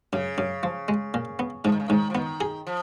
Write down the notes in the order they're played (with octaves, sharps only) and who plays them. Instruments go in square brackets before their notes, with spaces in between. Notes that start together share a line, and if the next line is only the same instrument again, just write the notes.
[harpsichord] F#2 [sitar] C#3
[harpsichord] F#2
F3
G#3
A#2
B3
[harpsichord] G#2 [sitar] F3
[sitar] D#3
C#3
[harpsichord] G#2 [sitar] D#3
[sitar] F3
[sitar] D#3 [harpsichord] B3
[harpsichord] G#4
[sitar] F3